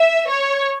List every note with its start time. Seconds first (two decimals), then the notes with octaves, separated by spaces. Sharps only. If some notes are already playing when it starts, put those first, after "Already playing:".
Already playing: E5
0.29 C#5